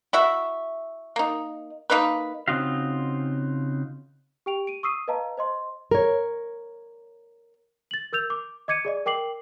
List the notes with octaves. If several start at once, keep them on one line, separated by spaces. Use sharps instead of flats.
E4 F#4 E5
A#3 D#4
A#3 D#4 A#4 B4
C#3 C4 D#4 F4 F#4 F5
G4 G5 D7 F7
D7 D#7
C#6 D#6 E6 C7 D#7
B4 D#5 F5 A5 A#5
C5 D#5 C6
A#4 C#5
A6 F#7
A#4 E6 G6 F7
D6
D#5 D6 G#6 C#7 D#7
G#4 D5 D#5
A#4 G5 D6 C7 F#7